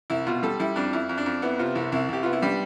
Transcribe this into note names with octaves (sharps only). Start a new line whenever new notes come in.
C2 E4
B2 F4
G3 A4
G3 E4
F2 D4
F2 E4
F2
D4
F2
B3 E4
C3 F4
C2 E4
C2 E4
C2 G4
B3 F4
E4
G3 D4